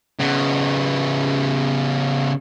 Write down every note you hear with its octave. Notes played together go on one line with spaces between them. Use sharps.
C#3 B3